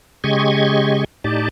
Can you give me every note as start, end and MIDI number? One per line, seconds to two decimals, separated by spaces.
0.24 1.04 49
0.24 1.04 56
0.24 1.04 67
0.24 1.04 75
0.24 1.04 85
0.24 1.04 92
1.24 1.49 45
1.24 1.49 63
1.24 1.49 67
1.24 1.49 74
1.24 1.49 81